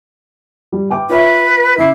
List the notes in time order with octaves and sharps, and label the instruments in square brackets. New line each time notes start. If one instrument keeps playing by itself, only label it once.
[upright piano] G3
B4 G5 D6
[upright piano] F4 C#5 E5 [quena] B4
[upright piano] C#3 D6 C7 [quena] E4